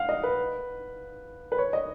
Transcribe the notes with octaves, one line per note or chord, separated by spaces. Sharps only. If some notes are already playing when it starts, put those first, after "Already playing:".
Already playing: F5 F#5
D#5
B4
B4
C#5
D#5